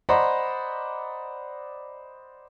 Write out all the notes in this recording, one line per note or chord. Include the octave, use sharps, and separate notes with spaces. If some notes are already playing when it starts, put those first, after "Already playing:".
C5 D5 D#5 F#5 A#5 B5